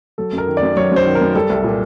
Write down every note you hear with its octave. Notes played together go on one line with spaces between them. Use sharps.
F#3 A4
F#2 A#4
D#3
D5
F#2
F#3 C#5
F#2 C5
D#3
A#4
F#2
G3 A4
C2
A#2